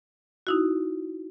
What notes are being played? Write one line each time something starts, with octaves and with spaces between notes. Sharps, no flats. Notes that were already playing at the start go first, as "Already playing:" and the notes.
D#4 E4 F#4